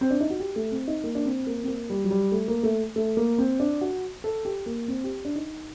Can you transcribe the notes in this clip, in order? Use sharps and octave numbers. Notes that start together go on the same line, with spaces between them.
C4
D4
D#4
F#4
G4
A3
C4
D#4
A#3
D4
C4
A#3
C4
A#3
G3
F#3
G3
A3
A#3
A3
A3
A#3
C4
D4
F#4
A4
G4
A#3
C4
G4
D4
D#4